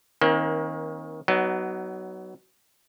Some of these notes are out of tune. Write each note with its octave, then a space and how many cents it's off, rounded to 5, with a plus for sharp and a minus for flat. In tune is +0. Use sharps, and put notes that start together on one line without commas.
D#3 +20 A#3 +35 C#4 -45
F#3 +20 B3 +0 D#4 +0